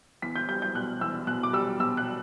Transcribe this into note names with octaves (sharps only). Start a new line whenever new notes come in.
E2 B6
G6
G3 G6
G6
B2 F#6
E2 E6
B2 F#6
D6
G3 E6
B2 E6
F#6